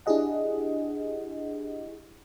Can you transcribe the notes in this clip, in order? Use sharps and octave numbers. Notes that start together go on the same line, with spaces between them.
D4 E4 G4 G#4 D#5 F#5